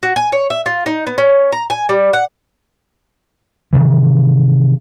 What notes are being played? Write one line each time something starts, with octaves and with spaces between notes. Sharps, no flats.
F#4
G#5
C#5
E5
F4
D#4
B3
C#4
A#5
G#5
G3
F#5
C3 D#3 E3